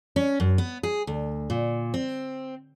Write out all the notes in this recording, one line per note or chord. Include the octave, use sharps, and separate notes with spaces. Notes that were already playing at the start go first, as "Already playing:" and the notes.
C#4
F#2
B3
G#4
D2
A#2
C4